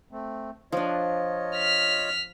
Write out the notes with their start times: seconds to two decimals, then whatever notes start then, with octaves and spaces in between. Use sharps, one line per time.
0.11 A3 C4
0.72 F3 D4 F4 C#5 D#5
1.56 F6 B6